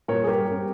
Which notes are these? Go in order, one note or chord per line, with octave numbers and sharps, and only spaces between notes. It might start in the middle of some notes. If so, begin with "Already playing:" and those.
A#2 G3 A#4 C#5
G#4
G2 G4 A#4
G3 C4